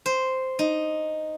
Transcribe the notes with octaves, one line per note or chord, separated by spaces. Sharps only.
C5
D#4